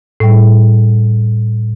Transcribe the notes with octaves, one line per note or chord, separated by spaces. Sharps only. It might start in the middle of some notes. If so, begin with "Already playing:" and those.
A2 G3